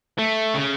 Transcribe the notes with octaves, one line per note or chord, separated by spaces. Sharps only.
A3
C#3